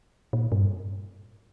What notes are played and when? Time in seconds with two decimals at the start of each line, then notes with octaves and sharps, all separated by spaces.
0.33 A#2
0.52 G2